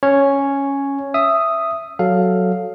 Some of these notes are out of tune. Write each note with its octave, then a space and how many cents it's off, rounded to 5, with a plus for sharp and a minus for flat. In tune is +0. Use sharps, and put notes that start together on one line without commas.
C#4 +0 C#5 +0
E5 +10 D#6 +0
F#3 +0 A4 +0 F5 +0